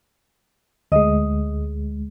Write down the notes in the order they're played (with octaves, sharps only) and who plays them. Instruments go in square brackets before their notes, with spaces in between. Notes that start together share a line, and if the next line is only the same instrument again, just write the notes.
[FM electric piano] D2 G#3 [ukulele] D#5